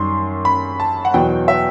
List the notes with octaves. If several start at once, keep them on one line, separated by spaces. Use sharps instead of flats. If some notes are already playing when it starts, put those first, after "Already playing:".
Already playing: F#2 D#3 G3 C6
B5
A5
F#5
E2 B2 F#3 G5
E5